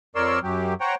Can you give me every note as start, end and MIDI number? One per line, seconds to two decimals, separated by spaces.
0.15 0.39 41
0.15 0.39 70
0.15 0.39 73
0.15 0.39 74
0.15 0.39 84
0.15 0.39 88
0.43 0.74 42
0.43 0.74 54
0.43 0.74 67
0.81 0.95 72
0.81 0.95 73
0.81 0.95 78
0.81 0.95 79
0.81 0.95 82